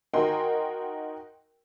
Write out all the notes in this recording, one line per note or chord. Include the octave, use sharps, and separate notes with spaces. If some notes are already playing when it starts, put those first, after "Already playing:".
D#4 F#4 A#4 G5 G#5 C6